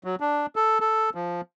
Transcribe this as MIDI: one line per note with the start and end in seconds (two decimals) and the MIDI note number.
0.04 0.15 54
0.20 0.46 62
0.56 0.78 69
0.80 1.10 69
1.15 1.41 53